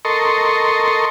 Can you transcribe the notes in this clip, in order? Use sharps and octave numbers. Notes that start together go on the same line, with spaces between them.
A4 A#4 D#5 C6 C#6